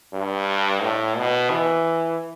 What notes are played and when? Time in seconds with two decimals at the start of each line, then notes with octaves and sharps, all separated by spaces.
0.13 G2
0.83 A2
1.18 B2
1.51 E3